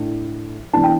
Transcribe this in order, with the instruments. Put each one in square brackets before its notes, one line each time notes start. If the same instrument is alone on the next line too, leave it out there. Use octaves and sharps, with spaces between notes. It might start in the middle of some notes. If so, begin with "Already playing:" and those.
Already playing: [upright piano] A2 A3 D4
E3 B3 D4 A5
G5